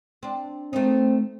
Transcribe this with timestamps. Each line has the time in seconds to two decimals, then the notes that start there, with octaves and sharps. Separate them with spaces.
0.23 C4 D4
0.73 A3 A#3 C4 D#4